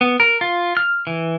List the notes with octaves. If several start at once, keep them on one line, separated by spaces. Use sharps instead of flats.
B3
A#4
F4
F6
E3